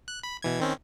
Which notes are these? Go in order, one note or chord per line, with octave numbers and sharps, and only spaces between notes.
F#6
B5
B2 E3 G#6
D#3 C4 C#4